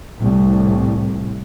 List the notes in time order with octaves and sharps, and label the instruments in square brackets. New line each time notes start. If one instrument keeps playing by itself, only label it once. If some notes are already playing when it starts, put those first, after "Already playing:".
[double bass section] C2 A2